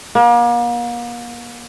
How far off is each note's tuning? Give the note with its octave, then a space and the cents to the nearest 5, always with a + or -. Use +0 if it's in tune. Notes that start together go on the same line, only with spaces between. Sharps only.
A#3 +40